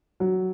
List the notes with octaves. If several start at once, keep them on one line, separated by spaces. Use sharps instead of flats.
F#3